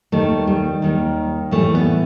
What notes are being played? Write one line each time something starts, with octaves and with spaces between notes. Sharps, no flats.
D#2 D#3 G3 A3
G3
D#2 D#3 G3
A2 E3 G3 A3
B3